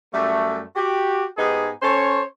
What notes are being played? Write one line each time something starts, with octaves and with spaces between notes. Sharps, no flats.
F#2 G3 A3
F#4 G4
G#2 B3 D#4 G4 G#4
C#4 A4 C5 C#5